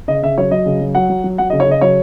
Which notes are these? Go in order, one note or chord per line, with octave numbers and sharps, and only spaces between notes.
C#3 D#5
C#3 E5
F#3 C#5
F#3 D#5
C#3
F#3
F#3 F#5
F#3
F#3
F#3 F#5
D#5
C#3
C#5
C#3 D#5
F#3 C#5